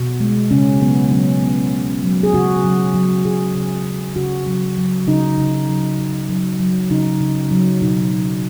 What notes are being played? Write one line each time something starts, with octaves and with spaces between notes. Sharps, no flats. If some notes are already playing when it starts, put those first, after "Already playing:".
Already playing: B2 F#4
G#3
C#3 C#4
F#3 B3
B3
F#3 C#4
C#3 B3
C#3
C#4
F#3
G#4
C#3 F#4
F#3
F#3
C#3 G#4
C#3
F#3
C#3 F#4
F#3
F#3
C#3 D#4
C#3
F#3
C#3
F#3
F#3
C#3 D#4
C#3
F#3
B2 D#4
F#3